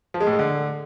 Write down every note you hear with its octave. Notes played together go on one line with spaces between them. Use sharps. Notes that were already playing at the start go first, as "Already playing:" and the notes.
F3
G#3
A2
G#3
D3